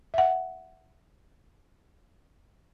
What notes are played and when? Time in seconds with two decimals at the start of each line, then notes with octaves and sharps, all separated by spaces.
0.14 E5 F#5